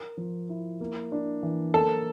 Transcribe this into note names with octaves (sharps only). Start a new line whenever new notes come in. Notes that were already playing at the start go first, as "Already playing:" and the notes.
Already playing: A#4
F3
E4
A#3
D4
E3
A#3 A4